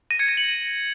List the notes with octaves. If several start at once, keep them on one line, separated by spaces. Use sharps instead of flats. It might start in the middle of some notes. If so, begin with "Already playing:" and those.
A#6 D#7
G#6 C#7
A#6 D#7
C#7 F#7